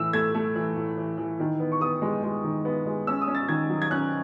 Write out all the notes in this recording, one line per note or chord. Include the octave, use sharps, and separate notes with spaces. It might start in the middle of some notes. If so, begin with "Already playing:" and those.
Already playing: A2 E3 E6
A3 G#6
A3
E3
A2
E3
E3
D#3
B3
C#6
B3 D#6
G#3
G#3
D#3
B3
G#3
C#4 E6
D#6
C#4
A6
D#3 G#6
F#3
G#6
C#4 F#6